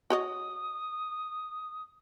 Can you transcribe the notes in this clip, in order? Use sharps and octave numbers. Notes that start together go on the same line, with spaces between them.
F#4 C#5 D#5 D#6